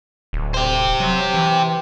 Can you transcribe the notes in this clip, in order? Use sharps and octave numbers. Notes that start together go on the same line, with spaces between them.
D1
G4 C5
F#3
E3